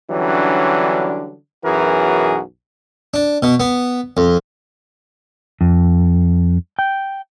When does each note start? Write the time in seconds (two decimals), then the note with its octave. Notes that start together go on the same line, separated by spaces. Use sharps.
0.11 D3 E3 F#3 G3 C#4 D4
1.65 B1 F#2 E3 F#4 G#4 A#4
3.14 D4
3.42 B2
3.60 B3
4.17 F2
5.61 F2
6.79 G5